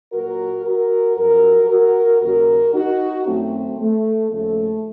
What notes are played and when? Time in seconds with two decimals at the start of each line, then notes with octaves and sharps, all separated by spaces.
0.13 A#2 F#3 F#4 A#4
0.65 F#4 A#4
1.17 F#2 F3 F#4 A#4
1.70 F#4 A#4
2.22 D#2 C#3 F#3 F#4 A#4
2.74 D#4 F#4
3.27 F#2 D#3 F#3 A3 C4
3.79 A3
4.31 D#2 C#3 F3 A3